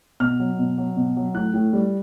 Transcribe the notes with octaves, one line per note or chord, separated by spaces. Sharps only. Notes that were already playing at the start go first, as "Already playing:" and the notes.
B2 F6
F#3
B2
F#3
B2
F#3
A2 F#6
A2
G3